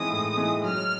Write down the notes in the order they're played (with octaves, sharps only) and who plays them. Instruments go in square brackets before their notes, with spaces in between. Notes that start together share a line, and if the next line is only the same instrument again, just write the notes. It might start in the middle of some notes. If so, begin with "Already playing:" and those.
Already playing: [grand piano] E3 G#3 C4 D#4 [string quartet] D#6
[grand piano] A2
E3 G#3 C4 D#4
[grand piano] F#3 [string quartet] F6